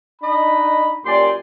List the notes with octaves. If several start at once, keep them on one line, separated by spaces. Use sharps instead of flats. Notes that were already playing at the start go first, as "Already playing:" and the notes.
D4 D#4 D#5 B5
F#2 A#2 G4 D5 G#5 C6